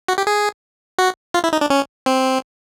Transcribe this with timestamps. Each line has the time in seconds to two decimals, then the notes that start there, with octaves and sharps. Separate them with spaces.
0.08 F#4
0.18 G4
0.27 G#4
0.98 F#4
1.34 F4
1.44 E4
1.53 D#4
1.61 D4
1.70 C#4
2.06 C4